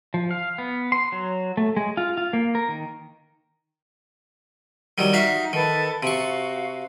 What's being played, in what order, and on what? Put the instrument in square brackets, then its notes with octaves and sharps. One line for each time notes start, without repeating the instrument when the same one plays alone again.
[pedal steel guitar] F3
F5
B3
C6
F#3
A3
G#3
F4
F4
A#3
A#4
D#3
[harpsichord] D#3 F#3 G3 [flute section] D#4
[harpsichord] F#4 E5 F5
[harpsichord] D#3 [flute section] A4 B4 A5
[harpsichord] C3 C#6 [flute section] F#4 F5